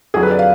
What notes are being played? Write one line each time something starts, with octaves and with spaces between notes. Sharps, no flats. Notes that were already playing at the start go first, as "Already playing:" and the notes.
F2 D3 F#3 G#4
B4
D5
F5